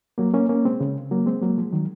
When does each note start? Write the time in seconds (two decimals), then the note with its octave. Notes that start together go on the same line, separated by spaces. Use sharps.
0.18 F#3 A#3
0.34 A#3 C#4
0.49 A#3 C#4
0.65 G#3 C4
0.81 C#3
1.11 F#3 A#3
1.26 G#3 C4
1.42 F#3 A#3
1.58 F3 G#3
1.72 D#3 F#3